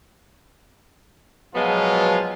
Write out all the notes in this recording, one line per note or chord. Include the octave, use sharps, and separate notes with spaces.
B2 F3 F#3 G#3 B3 F4